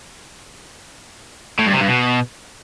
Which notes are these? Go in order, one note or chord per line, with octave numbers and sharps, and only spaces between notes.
A2
G2
C3
G2
B2